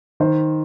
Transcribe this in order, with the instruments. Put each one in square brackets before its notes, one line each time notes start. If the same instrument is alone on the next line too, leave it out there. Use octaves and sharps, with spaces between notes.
[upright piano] D#3 C5